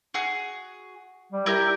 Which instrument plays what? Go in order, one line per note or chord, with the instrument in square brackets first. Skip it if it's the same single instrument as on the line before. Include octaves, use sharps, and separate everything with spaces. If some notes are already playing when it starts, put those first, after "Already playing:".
[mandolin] F#4 G#4
[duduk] G3
[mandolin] E4 A#4 [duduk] G4